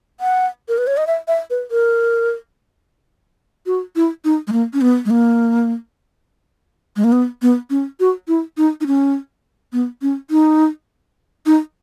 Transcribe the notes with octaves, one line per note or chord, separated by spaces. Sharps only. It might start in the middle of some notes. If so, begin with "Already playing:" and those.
F#5
A#4
B4
C#5
D#5
E5
E5
B4
A#4
F#4
E4
D#4
G#3
A#3
C#4
B3
G#3
A#3
G#3
A#3
B3
B3
C#4
F#4
E4
D#4
D#4
C#4
B3
C#4
D#4
D#4